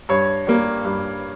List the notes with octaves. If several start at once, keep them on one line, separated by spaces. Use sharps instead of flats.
G2 C#5
G3 A#3
G2